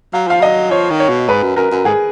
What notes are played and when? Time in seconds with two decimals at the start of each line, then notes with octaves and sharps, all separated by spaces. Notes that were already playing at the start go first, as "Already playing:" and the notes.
0.13 F#3 F5
0.27 F3 F5
0.41 F#3 D#5
0.71 F3 C#5
0.90 D#3
1.00 C#5
1.09 B2
1.28 G#2 B4
1.43 F#2
1.56 F#2 A#4
1.71 F#2
1.85 G#2 G#4